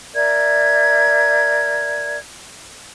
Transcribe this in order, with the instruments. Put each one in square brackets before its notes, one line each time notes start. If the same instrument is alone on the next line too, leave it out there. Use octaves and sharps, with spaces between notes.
[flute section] A#4 D5 E5 G#6